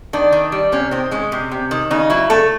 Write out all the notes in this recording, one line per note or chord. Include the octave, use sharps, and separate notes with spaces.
D#3 D4
D#3
G3
C3 C#4
D#3 C4
G#3 C#4
C3
C3
D#3
C#3 D#4
F#3 E4
A3 A4